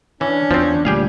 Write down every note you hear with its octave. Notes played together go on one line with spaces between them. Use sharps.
E3 C#4 D4
E2 F3 C4
D2 A#2 G3 G4 G#4 F5